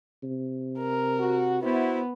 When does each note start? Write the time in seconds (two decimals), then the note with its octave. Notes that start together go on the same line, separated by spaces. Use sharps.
0.23 C3
0.79 A#4
1.19 F#4
1.62 B3 E4 F#4 C5